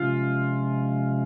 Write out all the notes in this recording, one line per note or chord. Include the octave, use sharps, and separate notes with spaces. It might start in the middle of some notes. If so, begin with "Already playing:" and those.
Already playing: C3 F3 G#3 C#4 F4